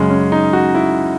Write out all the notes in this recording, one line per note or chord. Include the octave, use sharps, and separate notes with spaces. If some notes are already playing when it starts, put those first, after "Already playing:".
Already playing: F#2 C#3 G#3
C#4
D#4
F#4
E4